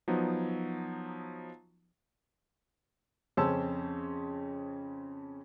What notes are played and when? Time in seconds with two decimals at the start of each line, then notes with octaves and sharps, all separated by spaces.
0.08 F3 F#3 B3 D#4
3.37 F2 C#3 C#4 C5 A5 E6